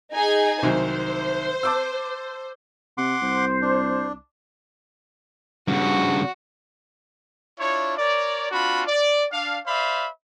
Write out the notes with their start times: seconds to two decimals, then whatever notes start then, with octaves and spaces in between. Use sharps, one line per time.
0.13 D#4 G#4 G#5
0.62 C2 D#3 F#3 C5
1.63 A5 D6 E6
2.98 C3 F#5 C6 D6
3.22 C2 C5
3.62 D4
5.68 G2 C#3 F#4
7.58 D4 E4 F4 C#5
7.98 A#4 C#5 D5
8.51 C4 D4 F4 F#4 B5
8.87 D5
9.32 D4 F5
9.65 C5 D5 E5 F5 B5